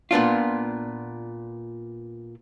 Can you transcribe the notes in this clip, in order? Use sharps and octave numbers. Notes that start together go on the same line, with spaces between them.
A#2 B3 D4 F4